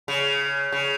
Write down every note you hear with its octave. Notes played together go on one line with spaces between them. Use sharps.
C#3
C#3